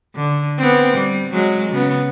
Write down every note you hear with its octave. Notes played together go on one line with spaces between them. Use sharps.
D3
B3 C4
G3
F#3 G#3
C#3 B3